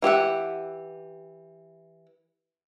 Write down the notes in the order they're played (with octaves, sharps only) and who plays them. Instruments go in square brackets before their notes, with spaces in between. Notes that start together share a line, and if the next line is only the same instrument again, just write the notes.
[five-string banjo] E3 G4 E5 F#5